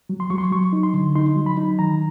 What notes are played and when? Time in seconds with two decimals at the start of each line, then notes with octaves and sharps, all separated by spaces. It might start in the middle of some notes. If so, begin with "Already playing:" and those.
0.09 F#3
0.20 C6
0.30 F#3 C#6
0.38 C6
0.52 F#3 C#6
0.73 D#4
0.83 C6
0.94 D3
1.15 D#4 C6
1.36 F#3
1.46 B5
1.57 D#4
1.79 D#3 A#5